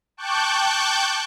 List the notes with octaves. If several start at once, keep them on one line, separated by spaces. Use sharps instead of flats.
G5 A5 C#6 D6 F#6 G6